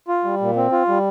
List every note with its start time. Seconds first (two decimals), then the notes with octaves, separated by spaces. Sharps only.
0.08 F4
0.24 G3
0.41 A#2
0.56 C4
0.72 F4
0.88 G3